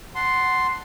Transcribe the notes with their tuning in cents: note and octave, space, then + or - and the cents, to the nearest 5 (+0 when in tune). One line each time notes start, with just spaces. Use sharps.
F#5 +0 A5 +0 C6 +0